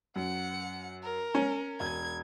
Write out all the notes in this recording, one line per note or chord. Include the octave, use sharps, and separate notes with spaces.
F#2 F#5 C#7
A#4
C#4
E1 G#6